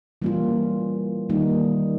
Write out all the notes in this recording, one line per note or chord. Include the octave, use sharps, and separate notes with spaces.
E3 G3 A#3 C#4 F4
D#3 G3 A#3 D#4